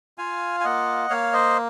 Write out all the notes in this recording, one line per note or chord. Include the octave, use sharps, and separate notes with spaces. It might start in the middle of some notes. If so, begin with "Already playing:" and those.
F4 F5 G#5
G#5
A#3 D#5 F#5
A#3 C#5 F5
C5 D#5